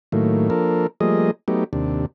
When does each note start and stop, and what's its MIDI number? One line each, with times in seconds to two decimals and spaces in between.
0.12 0.49 45
0.12 0.49 51
0.12 0.49 54
0.12 0.49 57
0.12 0.49 58
0.50 0.87 53
0.50 0.87 58
0.50 0.87 62
0.50 0.87 69
0.50 0.87 70
1.00 1.31 53
1.00 1.31 55
1.00 1.31 57
1.00 1.31 58
1.00 1.31 68
1.00 1.31 75
1.48 1.64 54
1.48 1.64 57
1.48 1.64 59
1.48 1.64 63
1.48 1.64 67
1.73 2.06 39
1.73 2.06 48
1.73 2.06 62